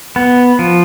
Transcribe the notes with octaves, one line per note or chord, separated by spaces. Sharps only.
B3
F3